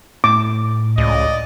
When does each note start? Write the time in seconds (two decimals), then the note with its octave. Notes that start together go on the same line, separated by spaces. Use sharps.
0.24 A2 D6
0.98 C#2 D5 D#5